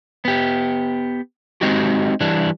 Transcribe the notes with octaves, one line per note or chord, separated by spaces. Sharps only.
B3 G4
G#3 C4 D#4 F#4 G4
E3 G3 D4